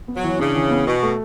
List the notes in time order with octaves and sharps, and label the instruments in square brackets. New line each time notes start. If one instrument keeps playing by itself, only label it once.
[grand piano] B3
[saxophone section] F#3
[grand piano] E3
[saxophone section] C#3 [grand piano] D4
[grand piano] E3
B3
[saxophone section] B2 [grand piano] F#4
[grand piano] A3